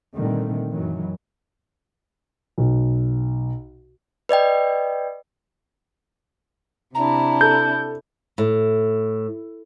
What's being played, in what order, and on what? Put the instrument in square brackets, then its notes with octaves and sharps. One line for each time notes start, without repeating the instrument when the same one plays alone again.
[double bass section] A#2 D3 D#3 G3 A3 C4
F#2 D#3 E3 F#3
[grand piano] B1
[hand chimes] B4 D5 D#5 G5
[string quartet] C3 D4 E4 [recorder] A#5
[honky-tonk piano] A4 [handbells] G6
[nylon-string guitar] A2